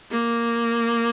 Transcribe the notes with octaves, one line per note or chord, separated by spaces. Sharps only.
A#3